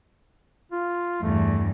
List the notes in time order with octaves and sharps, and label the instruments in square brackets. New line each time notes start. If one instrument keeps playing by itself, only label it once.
[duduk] F4
[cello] E2 G2 [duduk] A3